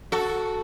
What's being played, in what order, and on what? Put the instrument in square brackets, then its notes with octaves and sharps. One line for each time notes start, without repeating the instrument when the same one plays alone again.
[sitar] F#4 A4